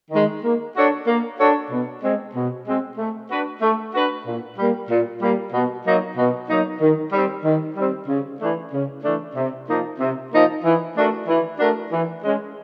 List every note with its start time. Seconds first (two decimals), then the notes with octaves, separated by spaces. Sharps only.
0.11 D#3 G#3
0.43 A#3
0.75 D4 F#4 A4 C#5
1.07 A#3
1.38 D4 F#4 A4 C#5
1.71 B2
2.02 G#3 C4
2.35 B2
2.66 G#3 C4
2.98 A3
3.30 D4 F#4 B4
3.61 A3
3.93 D4 F#4 B4
4.26 A#2
4.58 G3 A#3
4.90 A#2
5.22 G3 A#3
5.53 B2
5.85 F#3 A#3 D#4
6.18 B2
6.49 F#3 A#3 D#4
6.80 D#3
7.12 G3 C4
7.44 D#3
7.77 G3 C4
8.08 C#3
8.40 E3 A3 D4
8.73 C#3
9.04 E3 A3 D4
9.36 C3
9.68 F3 A#3 D#4
9.99 C3
10.32 F3 A#3 D#4
10.63 E3
10.96 A3 D4 F#4 A#4
11.27 E3
11.59 A3 D4 F#4 A#4
11.91 E3
12.23 G#3 C#4